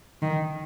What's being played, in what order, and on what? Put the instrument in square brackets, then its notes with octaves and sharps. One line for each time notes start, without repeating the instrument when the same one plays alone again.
[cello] D#3